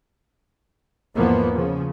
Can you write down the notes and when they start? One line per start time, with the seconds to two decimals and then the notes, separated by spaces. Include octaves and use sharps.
1.15 E2 G#2 F3 A#3 B3
1.53 C#3 F3